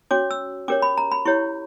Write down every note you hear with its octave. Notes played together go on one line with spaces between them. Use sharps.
C#4 F#4 C#5 D6
E6
C#4 G4 A#4 C#5 D6
B5
A#5
B5
E4 G4 C#5 C#6